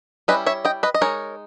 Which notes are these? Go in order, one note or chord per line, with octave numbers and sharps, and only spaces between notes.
G3 C#4 E4 B4 D#5
C#5 E5
D#5 G5
B4 D#5
D#5
G#3 D#4 A#4 C#5